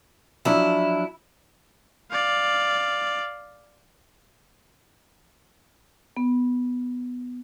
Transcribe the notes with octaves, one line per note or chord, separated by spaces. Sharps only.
F3 F#3 D4 E4
D5 F5
B3